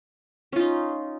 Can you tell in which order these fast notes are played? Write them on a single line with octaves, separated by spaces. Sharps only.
C#4 F4 D#4